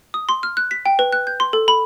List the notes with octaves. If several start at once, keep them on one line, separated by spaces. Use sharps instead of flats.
D#6
C6
F6
F#6
B6
G5
B4
F#6
G6
C6
A4
B5